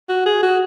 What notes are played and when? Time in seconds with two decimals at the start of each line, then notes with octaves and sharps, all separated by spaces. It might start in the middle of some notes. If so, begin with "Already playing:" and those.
0.09 F#4
0.26 G#4
0.43 F#4